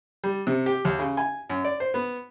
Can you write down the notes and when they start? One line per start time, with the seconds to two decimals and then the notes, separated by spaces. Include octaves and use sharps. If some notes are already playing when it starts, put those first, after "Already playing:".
0.24 G3
0.47 C3
0.66 G4
0.85 D#2
0.99 C#3
1.17 G#5
1.50 F#2
1.64 D5
1.80 C5
1.94 B3